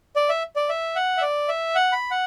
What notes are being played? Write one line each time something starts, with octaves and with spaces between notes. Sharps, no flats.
D5
E5
D5
E5
F#5
E5
D5
E5
F#5
B5
F#5